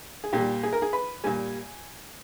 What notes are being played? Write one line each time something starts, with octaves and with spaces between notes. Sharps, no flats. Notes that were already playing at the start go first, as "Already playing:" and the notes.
G#4
A#2 G3 G4
G#4
A#4
G#4
B4
A#2 G3 G#5